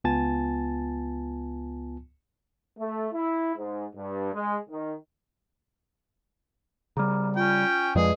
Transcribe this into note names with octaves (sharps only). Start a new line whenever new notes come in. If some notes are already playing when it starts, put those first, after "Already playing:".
C#2 B3 F4 G#5 A5 A6
A3
E4
G#2
G2
G#3
D#3
C#3 G3 A#5 D6 F6
C#4 F4 G5
F2 F3 G#3 G#4 B4 D5 D#5